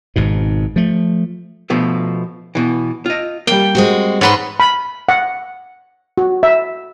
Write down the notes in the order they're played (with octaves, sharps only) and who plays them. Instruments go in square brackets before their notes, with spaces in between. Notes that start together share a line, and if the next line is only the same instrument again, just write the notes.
[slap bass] G#1 G#2 B2
F3 A3
[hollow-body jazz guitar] B2 F3 A3
B2 E3
F4 D#5
[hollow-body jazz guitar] G3 A#3 [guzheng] G5
[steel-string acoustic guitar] G#3 C4 F#4
[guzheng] G#2 B4 C6 [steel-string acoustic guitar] G#4 [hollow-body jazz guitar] C#5 F#5
[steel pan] B5
F#5
F#4
E5